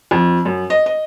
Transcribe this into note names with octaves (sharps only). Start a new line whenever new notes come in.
F2
F#2
D#5
D#5